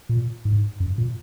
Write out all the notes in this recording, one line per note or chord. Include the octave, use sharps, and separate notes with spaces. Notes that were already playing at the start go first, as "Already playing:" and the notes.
A#2
G#2
F#2
A#2